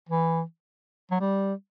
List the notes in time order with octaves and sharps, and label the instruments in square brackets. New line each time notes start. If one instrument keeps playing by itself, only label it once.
[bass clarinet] E3
F#3
G3